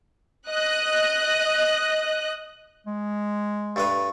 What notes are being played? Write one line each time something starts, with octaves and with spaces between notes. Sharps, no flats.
D#5 F#6
G#3
G2 A3 B4